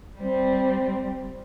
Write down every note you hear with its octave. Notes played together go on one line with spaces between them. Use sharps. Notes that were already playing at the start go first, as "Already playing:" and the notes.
G3 C4